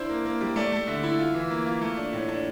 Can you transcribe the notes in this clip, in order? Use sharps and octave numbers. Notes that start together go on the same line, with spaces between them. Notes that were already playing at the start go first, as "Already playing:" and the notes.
Already playing: D4 E4 C5
A#3
A#3
G3
A3 D5
A3
D3 E5
E4
F4
E3
A#3
F4
A3
D4
A2
D4